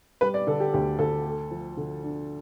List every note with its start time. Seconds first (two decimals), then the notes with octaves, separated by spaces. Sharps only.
0.21 G3 B4
0.34 D5
0.47 D3 A4
0.60 G4
0.73 D2 G4
0.99 D2 A4
1.25 A3
1.51 F3
1.77 D3
2.03 D4